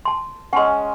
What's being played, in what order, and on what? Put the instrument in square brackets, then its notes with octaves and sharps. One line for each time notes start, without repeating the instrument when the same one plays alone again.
[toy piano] A5 C6
[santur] G#3 C#4 [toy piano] F#5 A5 C6